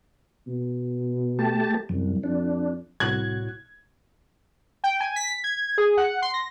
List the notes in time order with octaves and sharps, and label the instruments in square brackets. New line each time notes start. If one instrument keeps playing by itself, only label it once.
[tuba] B2
[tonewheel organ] A3 G4 A5
[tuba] C2 [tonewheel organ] F#2
[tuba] F2 [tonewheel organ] D4
[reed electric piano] C2 F#4 F#6 [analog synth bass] A2 [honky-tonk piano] G#6
[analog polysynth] G5
G#5
B6
G#6
G#4
F#5
C6
A#6